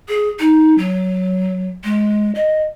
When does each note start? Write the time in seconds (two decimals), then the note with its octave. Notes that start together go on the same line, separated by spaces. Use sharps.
0.09 G#4
0.39 D#4
0.78 F#3
1.84 G#3
2.35 D#5